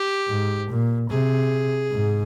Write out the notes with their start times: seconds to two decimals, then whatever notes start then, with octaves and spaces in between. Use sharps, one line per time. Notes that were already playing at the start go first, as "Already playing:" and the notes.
Already playing: G4
0.28 G#2
0.69 A#2
1.10 C3 G#4
1.92 G#2